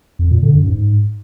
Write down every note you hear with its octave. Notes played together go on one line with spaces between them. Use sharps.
F2
A#2
D3
F#2
G#2